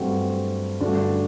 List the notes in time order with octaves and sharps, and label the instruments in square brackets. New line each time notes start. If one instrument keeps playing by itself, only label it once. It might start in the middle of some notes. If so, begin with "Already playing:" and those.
Already playing: [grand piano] G2 F#3 A3 C4 F#4
G2 D3 A3 D4 F#4